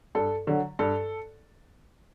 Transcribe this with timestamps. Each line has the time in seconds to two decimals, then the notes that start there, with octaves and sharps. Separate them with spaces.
0.15 G2 A4
0.47 D3 F#3
0.79 G2 A4